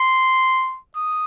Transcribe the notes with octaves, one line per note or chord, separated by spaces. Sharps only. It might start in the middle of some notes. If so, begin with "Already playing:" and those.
Already playing: C6
D#6